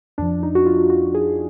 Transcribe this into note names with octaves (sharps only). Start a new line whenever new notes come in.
F2 F3 D4
D#4
F#4
F4
F#4
G#4